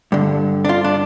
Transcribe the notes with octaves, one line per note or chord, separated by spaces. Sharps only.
G2 D3
D4
F4
D4